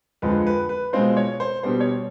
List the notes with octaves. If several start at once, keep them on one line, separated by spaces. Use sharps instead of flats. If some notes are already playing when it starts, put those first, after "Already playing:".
F2 D3 F3 G#3 C4 B4
B4
B4
B2 G#3 C4 F4 C5
C#5
C5
B2 G3 B3 C5
C#5